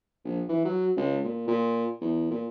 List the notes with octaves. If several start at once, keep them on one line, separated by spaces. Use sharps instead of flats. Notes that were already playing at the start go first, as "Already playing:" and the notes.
A#1
E3
F#3
C#2
A#2
A#2
E2
A#2